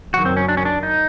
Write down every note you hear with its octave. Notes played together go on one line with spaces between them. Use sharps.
F#1 F#2 D#3 F#3 F#4
C4
C#4
D4
C#4
D4
D#4